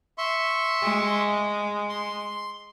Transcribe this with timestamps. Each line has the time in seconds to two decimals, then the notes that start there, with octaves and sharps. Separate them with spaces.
0.18 E5 C6 C#6
0.82 G#3
1.89 C6